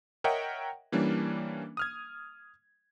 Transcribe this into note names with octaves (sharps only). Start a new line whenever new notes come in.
A#4 C#5 D#5 E5 F#5 G5
E3 G3 A#3 C#4 D4
D#6 F6 G#6